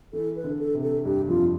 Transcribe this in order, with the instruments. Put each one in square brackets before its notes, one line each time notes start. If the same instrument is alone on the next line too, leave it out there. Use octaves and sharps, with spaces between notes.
[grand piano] E3 [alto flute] A4
[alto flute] B4
[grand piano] D3
[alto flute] A4
[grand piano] C3
[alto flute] A4
[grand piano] G2 [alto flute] G4
[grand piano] F2 [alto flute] F4